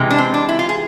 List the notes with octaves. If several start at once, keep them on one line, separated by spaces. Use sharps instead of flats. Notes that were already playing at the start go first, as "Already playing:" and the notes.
Already playing: C3 E3 G#3
D4
C4
D4
E4
F4
G#4